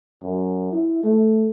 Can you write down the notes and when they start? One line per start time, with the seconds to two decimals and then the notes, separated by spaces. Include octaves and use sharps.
0.23 F#2
0.73 E4
1.04 A3